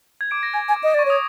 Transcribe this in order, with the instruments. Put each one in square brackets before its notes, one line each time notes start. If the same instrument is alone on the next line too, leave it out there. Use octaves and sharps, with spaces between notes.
[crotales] G#6
D6 D7
A#6
[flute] G#5 [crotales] G#6
[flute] G#5
[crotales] D6
[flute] D#5
[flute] D5 [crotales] C#6
[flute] C#5 [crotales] D#6